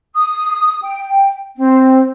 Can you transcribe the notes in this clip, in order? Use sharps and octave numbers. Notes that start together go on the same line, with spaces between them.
D#6
G5
C4